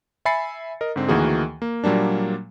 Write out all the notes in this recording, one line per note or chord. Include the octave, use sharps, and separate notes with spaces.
E5 G#5 B5 A6 C7 C#7
A#4 D#5
G#2 D3 C4
D2 D#3 E3 A#3 F#4 G#4
A#3
A#2 F#3 G3 A#3 D4